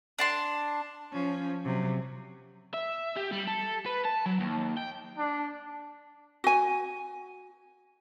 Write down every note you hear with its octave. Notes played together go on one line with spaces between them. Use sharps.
D4 A5 C6
F3 C#4
C3 F#3
E5
G4
G3
A4
B4
A5
F#3
D#2
G5
D4
F#4 G#5